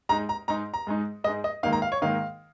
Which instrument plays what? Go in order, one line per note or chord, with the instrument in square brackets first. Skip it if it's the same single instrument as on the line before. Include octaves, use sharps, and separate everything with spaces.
[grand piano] G#2 G#3 D#4 A#5
A#5
G#2 G#3 D#4 A#5
A#5
G#2 G#3 D#4
G#2 D#5
G#3 D#4
D#5
G#2 D#3 A#3 D#4 F5
A#5
F5
C#5
G#2 D#3 A#3 D#4 F5